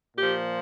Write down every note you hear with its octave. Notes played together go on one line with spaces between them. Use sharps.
A#2 F3 G4